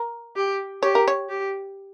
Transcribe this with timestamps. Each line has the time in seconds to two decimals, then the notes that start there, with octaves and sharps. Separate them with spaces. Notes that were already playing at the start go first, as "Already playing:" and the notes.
Already playing: A#4
0.36 G4
0.83 G4 C#5
0.95 A#4
1.08 C#5
1.29 G4